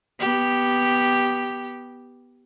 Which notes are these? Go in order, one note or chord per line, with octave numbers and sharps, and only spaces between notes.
B3 G4